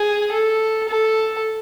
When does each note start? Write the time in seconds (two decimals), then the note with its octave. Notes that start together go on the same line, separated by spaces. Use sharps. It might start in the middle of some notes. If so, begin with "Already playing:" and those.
Already playing: G#4
0.32 A4
0.88 A4